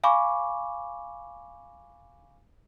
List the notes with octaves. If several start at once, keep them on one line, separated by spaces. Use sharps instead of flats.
F5 G#5 B5 C#6 D6